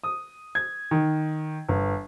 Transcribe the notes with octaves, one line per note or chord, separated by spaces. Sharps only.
D#6
G#6
D#3
G1